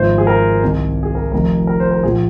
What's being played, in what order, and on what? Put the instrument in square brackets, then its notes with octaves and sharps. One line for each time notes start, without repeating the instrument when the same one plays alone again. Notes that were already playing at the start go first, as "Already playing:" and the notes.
Already playing: [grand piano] G#1 G#2 F3 C5
G#4
A#4
C2 C3 D#3
G#4
A#4
F1 F2 D#3 A#4
A#4
C5
A#4
A#1 A#2 F3 G#4